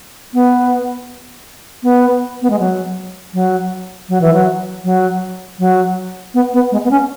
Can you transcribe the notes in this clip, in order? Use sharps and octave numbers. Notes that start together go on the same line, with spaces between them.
B3
B3
B3
G#3
F#3
F#3
F#3
E3
F#3
F#3
F#3
B3
B3
G#3
B3
C#4